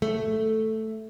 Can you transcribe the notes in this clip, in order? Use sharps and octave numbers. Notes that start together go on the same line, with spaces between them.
A3